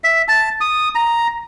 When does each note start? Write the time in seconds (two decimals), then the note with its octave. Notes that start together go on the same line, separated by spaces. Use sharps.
0.04 E5
0.28 A5
0.61 D#6
0.95 A#5